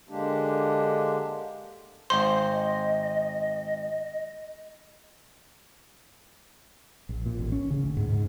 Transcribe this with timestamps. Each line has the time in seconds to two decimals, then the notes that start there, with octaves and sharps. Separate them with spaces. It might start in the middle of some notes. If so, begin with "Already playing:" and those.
0.09 D3 G#3 A#3 D4 G4
2.10 G#1 C5 D#5 C6
7.09 A#1
7.26 A#2
7.39 A1
7.52 C#4
7.70 C#3
7.83 D2
7.97 G#2
8.09 G#2